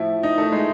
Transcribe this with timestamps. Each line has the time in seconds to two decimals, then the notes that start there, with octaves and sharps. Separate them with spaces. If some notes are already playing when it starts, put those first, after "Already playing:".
Already playing: A2 F3 E4
0.23 D#4
0.38 A3
0.52 G#3